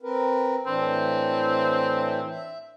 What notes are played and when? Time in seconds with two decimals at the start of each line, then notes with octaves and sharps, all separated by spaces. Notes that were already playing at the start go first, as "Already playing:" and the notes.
0.02 C4 A#4 B4
0.67 A2 E3 C4 D4
2.30 E5